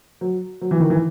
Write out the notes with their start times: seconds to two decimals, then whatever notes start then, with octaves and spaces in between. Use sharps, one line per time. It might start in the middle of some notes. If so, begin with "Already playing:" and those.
0.21 F#3
0.61 F#3
0.71 E3
0.80 D#3
0.90 E3